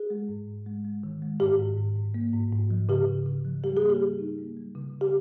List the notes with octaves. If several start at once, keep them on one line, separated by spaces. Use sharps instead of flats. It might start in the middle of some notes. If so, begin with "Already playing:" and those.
Already playing: G#4
G#3
G#2
G#2
G#3
G#3
D#3
G#3
G#2 G4
G#2
G#2
G#2
A#3
G#2
G#2
F3
C#3 G4
C#3
C#3
F3
G3 G4
G#4
A#3
G4
G3
D#4
A#3
G3
C#3
C#3
G4